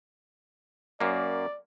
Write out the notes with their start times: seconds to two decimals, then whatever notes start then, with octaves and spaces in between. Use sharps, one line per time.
1.01 F#2 A#3 D5